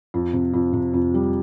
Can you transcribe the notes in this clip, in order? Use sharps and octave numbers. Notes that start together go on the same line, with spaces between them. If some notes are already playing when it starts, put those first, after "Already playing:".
F2
C3
F2
C3
F2
G3